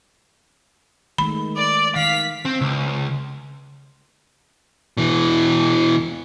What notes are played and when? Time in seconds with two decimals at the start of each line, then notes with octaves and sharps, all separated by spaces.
1.18 D#3 G#3 A3 B5
1.57 D5 D6
1.96 D#3 F5 B6
2.45 C4
2.61 C#2
4.97 B2 E3